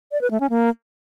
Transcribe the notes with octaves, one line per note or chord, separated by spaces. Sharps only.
D5
B4
A3
C#4
A#3